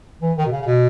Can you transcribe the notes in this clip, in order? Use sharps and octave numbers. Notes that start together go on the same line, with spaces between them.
E3
D#3
B2
C#3
C#3
B2